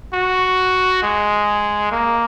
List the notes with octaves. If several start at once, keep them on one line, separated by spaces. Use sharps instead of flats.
F#4
G#3
A#3